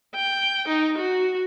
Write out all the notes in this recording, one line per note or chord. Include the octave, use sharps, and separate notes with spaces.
G5
D#4
F#4